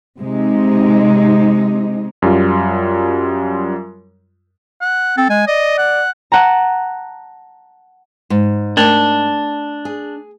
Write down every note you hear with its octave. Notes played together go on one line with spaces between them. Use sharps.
C3 G#3 D#4
F#2 G3 F4
F#5
C4 A4
G#3 G#5
D5 D#5
F#5
F#5 A5 A#5
G#2
A3 D4 A#4
G#4